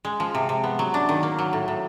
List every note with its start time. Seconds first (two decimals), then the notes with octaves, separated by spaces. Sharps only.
0.05 G#3
0.20 F3
0.35 C3
0.49 C3
0.64 B3
0.79 F#3
0.94 D4
1.09 D#3
1.23 A#3
1.39 F#3
1.53 A2
1.68 A2